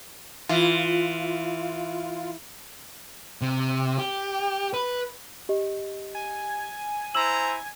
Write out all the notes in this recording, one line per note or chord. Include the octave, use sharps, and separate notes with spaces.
E3 F4
C3
G4
B4
G4 D#5
G#5
E4 C5 A#5 E6 E7 F#7